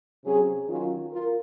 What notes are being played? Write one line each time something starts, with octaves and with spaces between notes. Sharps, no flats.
C3 F#3 C#4 G#4
D#3 F#3 C#4 F4
F4 A#4